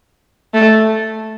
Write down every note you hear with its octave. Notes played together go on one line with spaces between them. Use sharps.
A3